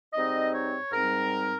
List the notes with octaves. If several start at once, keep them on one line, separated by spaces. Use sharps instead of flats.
G#2 G3 C4 D#4 D#5
C#5
G#2 G3 C4 D#4 A#4